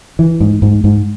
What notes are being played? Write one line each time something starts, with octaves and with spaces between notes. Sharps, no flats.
E3
G#2
G#2
G#2